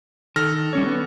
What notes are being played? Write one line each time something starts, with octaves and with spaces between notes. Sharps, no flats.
D#3 A4 F6 A#6
G3 C#4 C#5
B3